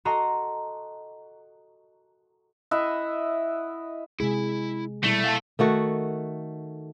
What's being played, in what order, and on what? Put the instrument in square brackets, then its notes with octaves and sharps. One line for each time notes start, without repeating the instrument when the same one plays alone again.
[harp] F#4 A4 D#5 A#5 C6
[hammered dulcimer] E4 D#5 E5 F#5
[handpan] C3 G#3 G#4 [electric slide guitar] E4
[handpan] B2 E4 [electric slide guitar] G3 [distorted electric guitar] A3
[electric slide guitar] F5 G5 A5
[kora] D#3 A3 F#4